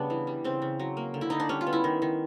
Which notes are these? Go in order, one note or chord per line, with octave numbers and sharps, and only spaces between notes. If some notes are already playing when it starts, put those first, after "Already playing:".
Already playing: C#3 G3 B3 D4
E3
G3
C#3 C4
C#3
F#3
A#3
D3
E4
D3 D#4
D4
G3 C#4
F4
B3
E4
D#3
D#3